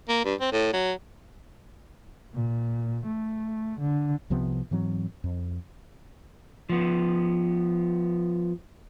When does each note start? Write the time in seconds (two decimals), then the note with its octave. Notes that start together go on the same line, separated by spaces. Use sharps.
0.09 A#3
0.25 G2
0.40 C4
0.52 A2
0.73 F#3
2.34 A#2
3.07 A3
3.80 D3
4.30 C2 C3 F3 B3
4.71 G#2 E3 F#3 C4
5.24 F2
6.69 F3 B3